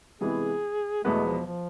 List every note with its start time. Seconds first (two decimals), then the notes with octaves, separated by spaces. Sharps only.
0.21 C3 E3 G#3 B3 E4 G#4
1.04 E2 B2 G#3 A3 B3
1.25 F3
1.46 F3